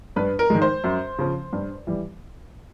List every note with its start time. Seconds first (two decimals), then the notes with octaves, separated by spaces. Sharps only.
0.16 G2 B4
0.39 A#4
0.50 D#3 G#3
0.62 C5
0.84 F#2
1.19 C#3 F3
1.53 G2
1.87 E3 G3